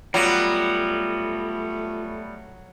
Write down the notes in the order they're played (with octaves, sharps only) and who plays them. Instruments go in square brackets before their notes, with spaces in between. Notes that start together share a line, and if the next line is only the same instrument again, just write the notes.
[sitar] F#3 [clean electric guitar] G3 B3 [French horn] A3 [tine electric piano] F4 A#6